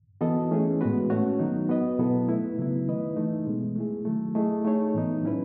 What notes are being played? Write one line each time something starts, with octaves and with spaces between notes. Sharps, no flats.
E3 B3 F#4 A4 D#5
E3 A3 C#4 G#4
A2 G#3 B3 F#4 B4
A3 C#4 F#4 C#5
D#3 F#3 B3 D#4
B3 F#4 B4 D#5
B2 F#3 B3 E4 A4
A3 E4 B4
C#3 F#3 B3 E4
D#3 A3 E4 B4 D#5
E3 A3 D#4
B2 G#3 B3
A3 E4 G#4
D#3 F#3 A3
A3 E4 G#4 D#5
A3 D#4 G#4 C#5
A2 E3 B3 D#4
F#3 C#4 E4 B4